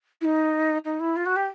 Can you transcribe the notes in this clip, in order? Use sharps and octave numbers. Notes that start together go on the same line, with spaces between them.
E4
D#4
D#4
E4
F4
F#4
G4